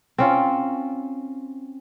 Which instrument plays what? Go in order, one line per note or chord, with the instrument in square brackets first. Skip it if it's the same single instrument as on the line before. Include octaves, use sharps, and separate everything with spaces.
[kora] C4 C#4 F4